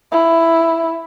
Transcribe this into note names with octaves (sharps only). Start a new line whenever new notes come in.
E4